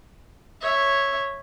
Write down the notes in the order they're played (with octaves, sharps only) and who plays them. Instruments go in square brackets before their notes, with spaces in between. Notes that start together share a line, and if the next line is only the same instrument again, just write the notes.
[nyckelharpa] C#5 E5